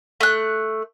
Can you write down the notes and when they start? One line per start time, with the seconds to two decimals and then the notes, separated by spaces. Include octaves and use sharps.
0.20 A3 F#6